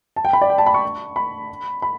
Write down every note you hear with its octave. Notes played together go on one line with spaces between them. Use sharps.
A5
G5
B5
D5
G5
A5
B5
C#6
B5
B5